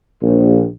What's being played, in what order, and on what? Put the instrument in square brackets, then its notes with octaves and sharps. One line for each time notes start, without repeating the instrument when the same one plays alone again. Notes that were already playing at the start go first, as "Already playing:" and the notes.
[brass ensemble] A#1